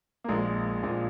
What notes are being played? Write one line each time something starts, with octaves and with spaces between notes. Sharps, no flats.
A#3
A#1 A#2 F3 G#3
A#1 A#2 F3